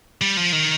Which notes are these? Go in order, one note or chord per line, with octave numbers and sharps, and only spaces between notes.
G3
F3
D#3